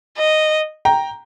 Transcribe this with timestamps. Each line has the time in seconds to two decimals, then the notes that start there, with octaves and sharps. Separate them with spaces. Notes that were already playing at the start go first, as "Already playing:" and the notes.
0.17 D#5
0.85 G5 A#5